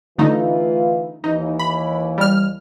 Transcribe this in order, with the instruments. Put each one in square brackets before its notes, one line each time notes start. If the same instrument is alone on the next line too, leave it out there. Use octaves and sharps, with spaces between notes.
[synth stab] D3 A3 D#4 [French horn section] E3 F4 B4
[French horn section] D#2 E3 [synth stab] D#4
[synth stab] B5
G3 F6